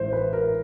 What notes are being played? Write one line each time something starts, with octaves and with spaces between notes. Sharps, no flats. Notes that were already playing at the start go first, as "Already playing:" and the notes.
Already playing: A1 G#2 E3 C5
B4
A#4